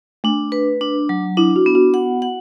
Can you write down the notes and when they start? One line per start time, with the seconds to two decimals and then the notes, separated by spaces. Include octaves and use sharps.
0.24 A3 D4
0.52 B4
0.81 D4
1.09 F#3
1.37 D4 E4
1.56 F#4
1.66 B3
1.75 F#4
1.94 F#5
2.22 F#5